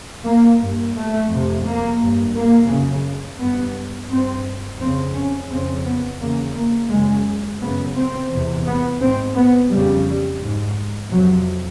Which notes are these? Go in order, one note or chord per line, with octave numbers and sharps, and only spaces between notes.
A#3
G2
A3
F2 C3
A#3
G2
A#3
F#2 C#3
G2 B3
G2 C4
F2 C#3 C4
C#4
F2 C#3 C4
B3
E2 C#3 A#3
A#3
F#2 C#3 G#3
F#2 C#3 B3
C4
E2 C3
B3
G#2 C4
B3
F2 C#3 G3
G#2
F2 C3 F#3